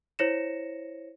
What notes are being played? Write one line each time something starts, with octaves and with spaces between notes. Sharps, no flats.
E4 C5 C#5 A#6 C#7 E7